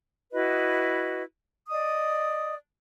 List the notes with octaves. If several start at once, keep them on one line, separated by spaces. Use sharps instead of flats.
E4 F#4 B4 D#5
D5 D#5 D#6